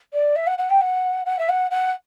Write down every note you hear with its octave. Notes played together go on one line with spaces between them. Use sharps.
D5
E5
F#5
F#5
G5
F#5
F#5
E5
F#5
F#5